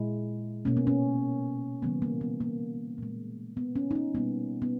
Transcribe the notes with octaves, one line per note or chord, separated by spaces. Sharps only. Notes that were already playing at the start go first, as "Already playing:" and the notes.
Already playing: A#2 G#3 E4
B2 A#3 C#4
B3
C#4
C#3 E3 G3 A#3 B3
A#3
B3
A#3
A#2 G#3
B3
C#4
D#4
C#4
B2 G3 A#3 B3
B3